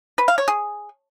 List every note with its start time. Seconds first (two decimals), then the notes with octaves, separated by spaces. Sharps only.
0.18 B4
0.28 F5
0.38 C#5
0.48 G#4